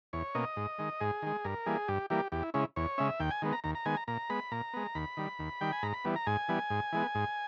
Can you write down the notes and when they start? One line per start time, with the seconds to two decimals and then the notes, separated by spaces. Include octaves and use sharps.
0.13 E2 C#5
0.35 B2 A#3 C#4 D#5
0.57 G#2
0.79 D#3 G#3
1.01 G#2 G#4
1.22 D#3 G#3
1.44 G2 A#4
1.66 E3 G3 A#3 G#4
1.88 G2 G4
2.10 E3 G3 A#3 G4
2.32 E2 G4
2.43 E4
2.54 C#3 G#3 C#4 E4
2.76 E2 C#5
2.98 C#3 G#3 C#4 E5
3.20 D#2 G5
3.31 G#5
3.42 D#3 G#3 B3
3.52 A#5
3.64 D#2 A#5
3.75 A#5
3.85 D#3 G#3 B3 G#5
3.97 A#5
4.08 A#2 A#5
4.30 G#3 B3 B5
4.52 A#2 A#5
4.73 G#3 B3
4.95 D#2 B5
5.17 D#3 G3
5.39 D#2
5.61 D#3 G3 G5
5.73 G#5
5.83 G#2 A#5
5.94 B5
6.05 E3 G3 B3
6.16 A#5
6.27 G#2 G#5
6.49 E3 G3 B3
6.70 G#2
6.92 E3 G#3 B3
7.15 G#2